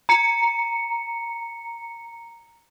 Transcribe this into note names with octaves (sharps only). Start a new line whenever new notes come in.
A#5 C#7